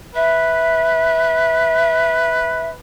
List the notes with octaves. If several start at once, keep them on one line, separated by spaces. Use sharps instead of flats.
B4 E5